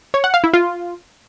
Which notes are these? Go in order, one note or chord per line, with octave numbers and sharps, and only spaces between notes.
C#5
F#5
F5
E4
F4